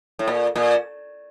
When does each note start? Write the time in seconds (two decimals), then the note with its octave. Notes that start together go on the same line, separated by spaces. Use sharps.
0.19 A2
0.28 A#2
0.56 A#2